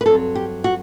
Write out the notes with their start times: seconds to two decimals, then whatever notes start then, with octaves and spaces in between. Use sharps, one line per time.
0.01 B4
0.06 G2 F#3 C4 A4
0.35 G4
0.64 F#4